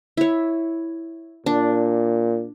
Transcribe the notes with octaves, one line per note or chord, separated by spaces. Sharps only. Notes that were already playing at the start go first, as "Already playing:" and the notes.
E4 C#5
A#2 D4